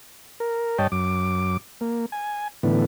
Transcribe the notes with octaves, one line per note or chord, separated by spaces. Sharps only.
A#4
G2 C#5 D#5 G5 A5
F#2 D6
A#3
G#5
A2 D3 E3 B3